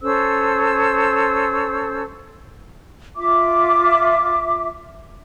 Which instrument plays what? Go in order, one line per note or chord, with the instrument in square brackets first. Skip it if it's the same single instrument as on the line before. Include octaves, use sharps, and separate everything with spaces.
[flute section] C#4 A4 C5 E6
F4 E5 D6